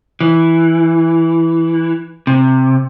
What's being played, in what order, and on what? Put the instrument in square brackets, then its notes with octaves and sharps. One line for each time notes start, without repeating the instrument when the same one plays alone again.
[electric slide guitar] E3
C3